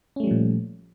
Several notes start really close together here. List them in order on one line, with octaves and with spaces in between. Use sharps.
C#4 A3 G3 F3 A#2